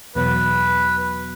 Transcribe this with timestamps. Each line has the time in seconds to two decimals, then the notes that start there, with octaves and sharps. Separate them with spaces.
0.15 E2 B2 F#3 B3 B4